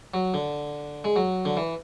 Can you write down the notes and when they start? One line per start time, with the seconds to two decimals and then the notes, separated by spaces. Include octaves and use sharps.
0.14 F#3
0.34 D3
1.04 G#3
1.16 F#3
1.45 D3
1.57 E3